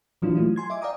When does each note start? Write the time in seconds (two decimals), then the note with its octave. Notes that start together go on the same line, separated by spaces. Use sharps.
0.22 A#2 E3 F#3 D4 F4
0.35 F#3 A3 E4 F4
0.56 G#5 C6 G#6
0.70 D#5 E5 G#5 D6
0.82 D5 F5 G5 A#5 D6 D#6